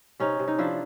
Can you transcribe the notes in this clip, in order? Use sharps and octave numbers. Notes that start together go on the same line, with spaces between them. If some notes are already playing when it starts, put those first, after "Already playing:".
C3 C#4 D#4
C3
D#4
F3 D4 E4